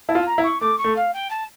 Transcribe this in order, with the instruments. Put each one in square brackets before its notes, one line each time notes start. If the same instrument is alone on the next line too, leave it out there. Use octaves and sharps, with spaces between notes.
[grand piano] E4 [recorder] A5
[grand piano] F4
[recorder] A#5
[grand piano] E4
[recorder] C#6
[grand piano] A3 [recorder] D6
[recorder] C#6
[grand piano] A3
[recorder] F5
G5
A5